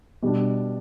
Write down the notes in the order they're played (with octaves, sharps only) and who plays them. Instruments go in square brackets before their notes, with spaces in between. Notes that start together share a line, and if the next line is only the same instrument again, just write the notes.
[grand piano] B2 G3 D4